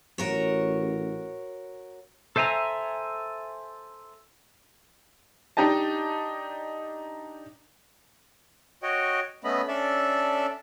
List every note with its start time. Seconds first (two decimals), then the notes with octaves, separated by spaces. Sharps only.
0.18 A1 F#4 A#4 C#5
2.36 A4 C5 E5 G#5 A#5
5.57 D4 D#4 G4 D#5 A5
8.83 F#4 C#5 D#5 G5
9.44 A3 B3 C#4 D#5 B5
9.68 C#4 D4 A4 D5 E5